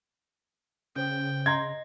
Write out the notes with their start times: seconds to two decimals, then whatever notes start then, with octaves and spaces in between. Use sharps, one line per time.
0.96 C#3 C#4 C5 G5
1.46 D#5 A#5 C6 G#6 A#6